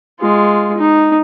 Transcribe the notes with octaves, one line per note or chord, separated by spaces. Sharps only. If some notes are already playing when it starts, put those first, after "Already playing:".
G#3 F4
D#4